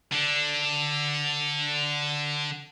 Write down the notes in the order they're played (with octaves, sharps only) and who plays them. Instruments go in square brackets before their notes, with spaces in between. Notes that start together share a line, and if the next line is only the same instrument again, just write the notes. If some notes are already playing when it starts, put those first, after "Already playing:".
[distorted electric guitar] D3 D4